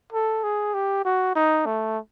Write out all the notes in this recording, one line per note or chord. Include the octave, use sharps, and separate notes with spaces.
A4
G#4
G4
F#4
D#4
A3